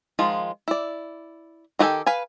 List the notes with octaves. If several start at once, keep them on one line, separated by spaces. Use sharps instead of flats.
D#3 F3 G#3 F4
E4 D5
D#3 F#4 G4 A4 G#5
B4 F5 G#5